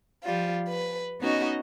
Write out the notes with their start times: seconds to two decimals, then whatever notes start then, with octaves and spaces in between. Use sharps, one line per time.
0.24 F3 G3 F4
0.69 B4
1.19 B3 C#4 D#4 F#4 D#5